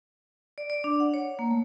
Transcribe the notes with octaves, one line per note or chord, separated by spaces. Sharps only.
D5
D5
D4
F#5
C#5
A#3
A3